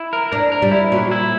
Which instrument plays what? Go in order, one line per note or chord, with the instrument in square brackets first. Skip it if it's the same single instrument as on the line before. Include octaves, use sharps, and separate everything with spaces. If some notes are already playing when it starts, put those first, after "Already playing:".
Already playing: [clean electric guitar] E4
A#4
[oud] D4 [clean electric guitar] A#4
[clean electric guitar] A#4
[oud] G3
[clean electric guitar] E4
[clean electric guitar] A#2 [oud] F#3
[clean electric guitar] E4